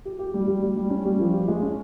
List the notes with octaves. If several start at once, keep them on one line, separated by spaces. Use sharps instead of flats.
G4
G4
G3
G3
G3
G3
C#4
G3
F3
G4
G#3
C#4